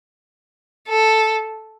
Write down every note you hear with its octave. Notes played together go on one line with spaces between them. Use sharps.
A4